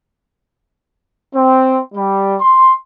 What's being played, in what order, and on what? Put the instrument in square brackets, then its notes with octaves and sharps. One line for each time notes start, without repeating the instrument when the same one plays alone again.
[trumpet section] C4
G3
C6